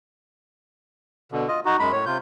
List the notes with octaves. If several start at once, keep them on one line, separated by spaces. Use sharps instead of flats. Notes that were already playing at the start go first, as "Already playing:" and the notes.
B2 D3
F4 D#5
D#4 F#4
F#2 G#3 B5
A2 C#5
C3 F4 G6